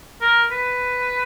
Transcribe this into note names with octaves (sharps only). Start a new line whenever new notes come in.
A#4
B4